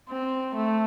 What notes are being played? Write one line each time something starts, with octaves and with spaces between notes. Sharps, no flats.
C4
A3